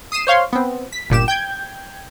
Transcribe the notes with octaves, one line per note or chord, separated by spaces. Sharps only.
D#6 C7 D#7 E7
C5 C#5 F5 C6
B3 C4
B6
G1 A#2 G4 E7
G5 G6 G#6